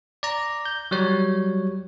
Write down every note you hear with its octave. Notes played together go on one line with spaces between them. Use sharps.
D5 A#5
G6
F#3 G3 C#5